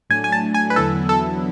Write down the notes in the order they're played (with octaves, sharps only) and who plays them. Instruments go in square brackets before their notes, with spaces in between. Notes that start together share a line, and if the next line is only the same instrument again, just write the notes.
[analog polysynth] A2 F#3 A3 D4 [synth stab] G#5
[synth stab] G#5
A5
G#5
B4
[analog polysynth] E2 D3 F#3 B3 E4 [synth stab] A4
[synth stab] A4